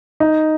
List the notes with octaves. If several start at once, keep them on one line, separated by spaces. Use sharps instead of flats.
D#4